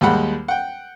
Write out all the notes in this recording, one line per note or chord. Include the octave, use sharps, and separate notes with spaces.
D#2 G3 G#3 F#5 B5
F#5 G5